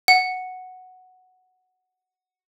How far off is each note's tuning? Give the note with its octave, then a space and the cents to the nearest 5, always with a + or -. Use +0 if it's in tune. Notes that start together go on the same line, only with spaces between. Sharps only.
F#5 +0